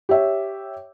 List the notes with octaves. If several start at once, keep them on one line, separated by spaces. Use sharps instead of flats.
G4 C#5 E5